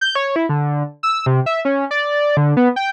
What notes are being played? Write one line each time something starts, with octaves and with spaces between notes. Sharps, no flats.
G6
C#5
E4
D3
E6
C3
E5
C#4
D5
D3
B3
G5